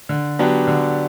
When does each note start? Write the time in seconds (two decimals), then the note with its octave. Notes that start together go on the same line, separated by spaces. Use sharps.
0.09 D3
0.39 F#3 B3 D4 G4
0.68 D3